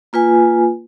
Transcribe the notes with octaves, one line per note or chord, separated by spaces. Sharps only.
A#3 F4 B4 G#5